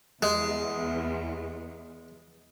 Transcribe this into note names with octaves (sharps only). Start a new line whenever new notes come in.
E2 G#3